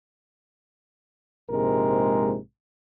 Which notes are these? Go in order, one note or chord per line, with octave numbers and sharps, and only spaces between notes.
A#1 G#2 C3 G#3 A#4